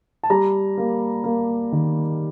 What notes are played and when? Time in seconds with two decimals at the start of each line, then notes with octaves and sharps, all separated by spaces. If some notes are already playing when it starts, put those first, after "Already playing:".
0.23 A5
0.30 G3 A#5
0.78 A#3
1.24 A#3
1.72 D#3